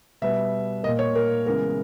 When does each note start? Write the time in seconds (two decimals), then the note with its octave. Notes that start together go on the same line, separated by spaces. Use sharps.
0.22 B2 G3 B3 E5
0.83 A#3 D#5
0.88 A#2
0.99 C#5
1.15 A#4
1.46 C#3 E3 G#3 B3 A#4